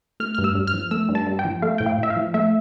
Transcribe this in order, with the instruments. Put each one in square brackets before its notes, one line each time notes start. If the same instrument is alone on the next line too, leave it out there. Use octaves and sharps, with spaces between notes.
[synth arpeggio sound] A3 F6
G2 F6
E6
G2
F6
F3
A3 E6
G2
A5
G2
G5
F3
A3 F5
A2 G5
F5
A2 E5
F5
F3
A3 E5